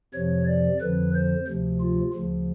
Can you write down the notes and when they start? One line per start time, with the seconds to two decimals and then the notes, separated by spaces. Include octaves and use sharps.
0.14 F2 C3 F3 C#5
0.47 D5
0.81 F2 D3 F3 B4
1.15 C5
1.47 D2 C3 F3
1.81 F4
2.14 D2 C#3 F3